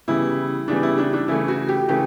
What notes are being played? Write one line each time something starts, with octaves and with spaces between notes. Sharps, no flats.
C#3 E3 G3 B3 E4
C#3 E3 G3 B3 D4
E4
D4
D4
C#3 E3 A3 E4
F#4
G4
C#3 E3 A3 G4